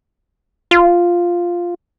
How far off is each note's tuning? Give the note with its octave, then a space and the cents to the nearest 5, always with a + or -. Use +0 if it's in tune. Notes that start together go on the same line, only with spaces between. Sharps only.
F4 +0